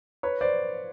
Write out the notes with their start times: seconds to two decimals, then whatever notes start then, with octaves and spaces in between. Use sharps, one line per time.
0.23 B4 C#5
0.41 C5 D5